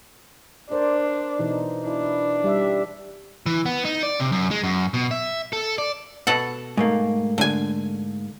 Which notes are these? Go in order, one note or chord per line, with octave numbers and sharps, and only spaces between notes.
D4 A#4 C5 D5
B2 E3 D#4
D4 E4
G3 E5
E3
B3
D#4
D5
C3
F#2
G#3
F#2
B2
E5
A4
D5
B2 A4 F#5
G#2 A3 A#3
D3 G#5